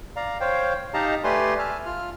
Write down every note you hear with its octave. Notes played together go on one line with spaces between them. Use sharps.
D5 F5 A#5
C5 C#5 F5 G5
D#4 G4 D#5 F5 A5 A#5
A3 G4 B4 D5 G#5 C6
E5 G#5 A5 F6
F4 F6